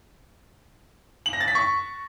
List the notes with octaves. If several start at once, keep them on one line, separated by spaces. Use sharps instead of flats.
F#7
A#6
A6
B6
C#6